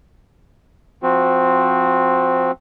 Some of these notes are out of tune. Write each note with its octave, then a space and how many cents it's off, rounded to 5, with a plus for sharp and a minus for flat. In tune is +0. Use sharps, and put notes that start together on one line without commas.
F3 +0 C4 +0 F#4 -15